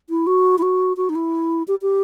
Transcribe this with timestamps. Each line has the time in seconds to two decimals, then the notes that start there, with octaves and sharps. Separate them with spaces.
0.10 E4
0.27 F#4
0.58 E4
0.62 F#4
0.97 F#4
1.09 D#4
1.15 E4
1.68 G4
1.82 G4